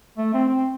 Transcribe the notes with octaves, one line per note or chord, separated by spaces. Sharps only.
A3
C4
C4